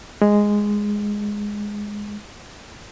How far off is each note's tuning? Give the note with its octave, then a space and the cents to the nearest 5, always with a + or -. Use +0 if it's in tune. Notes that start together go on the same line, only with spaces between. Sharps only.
G#3 -5